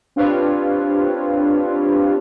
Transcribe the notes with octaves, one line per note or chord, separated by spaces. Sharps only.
C4 D4 F4 G4 B4 C#5